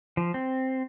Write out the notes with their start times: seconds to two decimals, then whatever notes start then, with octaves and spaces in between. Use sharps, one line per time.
0.17 F3
0.34 C4